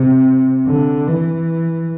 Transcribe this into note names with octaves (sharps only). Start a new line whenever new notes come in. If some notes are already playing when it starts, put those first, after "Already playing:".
Already playing: C3
D3
E3